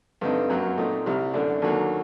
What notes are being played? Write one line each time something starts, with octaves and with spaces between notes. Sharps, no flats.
G2 D3 A3 C4 D#4
F#2 F#3 A#3
A#2 A3 C4 D#4
C2 C3 G3
F#2 D3 A3 D4
D#2 D3 F#3 A#3